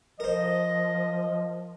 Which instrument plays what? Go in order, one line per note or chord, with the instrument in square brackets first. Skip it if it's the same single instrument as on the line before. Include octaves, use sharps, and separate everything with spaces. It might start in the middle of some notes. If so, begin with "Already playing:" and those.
[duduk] F3 [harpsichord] A#4 C5 [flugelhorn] D#5